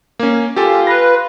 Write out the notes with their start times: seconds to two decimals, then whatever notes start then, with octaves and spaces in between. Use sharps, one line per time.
0.19 A#3 C#4
0.56 F4 G4 A4 G#5
0.87 B4 A#6